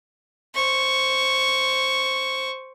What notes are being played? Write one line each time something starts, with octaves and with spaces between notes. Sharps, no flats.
C5 C#6